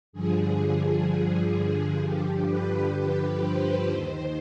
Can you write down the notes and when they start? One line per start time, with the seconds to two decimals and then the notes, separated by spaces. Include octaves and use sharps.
0.13 G2 D3 F3 G#4
0.60 G#4
2.01 G2 D3 F3 G4
2.48 B4
3.41 C5
3.88 D#2 D#3 C5